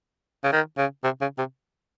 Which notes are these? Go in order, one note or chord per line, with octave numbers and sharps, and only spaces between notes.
C#3
D#3
C#3
C3
C#3
C3